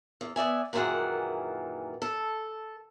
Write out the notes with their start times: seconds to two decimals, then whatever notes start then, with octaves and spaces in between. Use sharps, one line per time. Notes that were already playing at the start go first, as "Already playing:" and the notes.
0.21 E2
0.36 B3 D5 E5 G#5
0.73 F#2 A#2 D#3 E3 G#4 F#5
2.02 A4